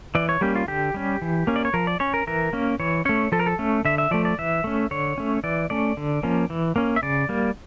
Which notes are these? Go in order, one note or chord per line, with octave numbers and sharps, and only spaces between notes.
E3 D5
C#5
G3 A#3 C#4 G4
F4
D3 G4
G3 C#4
E3
A#3 C#4
D5
C#5
F3 A#4
D5
C#4 C#5
A#4
E3 A#4
A#3 C#4
E3 C#5
A3 C#4 C#5
F3 A4
A#4
A4
A3 C#4
D3 E5
E5
F3 A3 D5
D5
E3 E5
A3 C#4
D3 C#5
A3 C#4
E3 D5
A3 C#4 D5
D3
F3 A#3 C#4
E3
A#3 C#4
E5
C#3 D5
G3 A#3